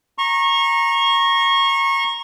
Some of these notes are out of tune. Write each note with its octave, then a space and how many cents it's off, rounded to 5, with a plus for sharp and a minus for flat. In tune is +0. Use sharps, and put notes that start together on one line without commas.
A#5 +0 C#6 -25